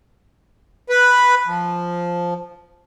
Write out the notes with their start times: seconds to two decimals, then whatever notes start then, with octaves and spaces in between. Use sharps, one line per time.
0.89 B4
1.47 F3